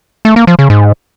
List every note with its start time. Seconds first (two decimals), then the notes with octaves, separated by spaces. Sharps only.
0.25 A3
0.36 A#3
0.47 F3
0.59 C#3
0.70 G#2